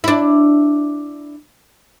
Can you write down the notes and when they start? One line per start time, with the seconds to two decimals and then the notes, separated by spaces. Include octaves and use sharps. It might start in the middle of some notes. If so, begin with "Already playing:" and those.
0.04 D4 E4